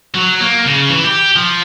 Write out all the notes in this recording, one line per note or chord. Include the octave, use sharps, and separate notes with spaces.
F#3
A#3
C#3
E3
G4
F3